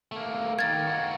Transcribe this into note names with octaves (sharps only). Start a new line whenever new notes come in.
A3 A#3
D#3 A#3 G#6 A6
A#3 F#4